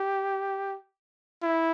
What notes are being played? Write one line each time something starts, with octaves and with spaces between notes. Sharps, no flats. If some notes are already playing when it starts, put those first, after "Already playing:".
Already playing: G4
E4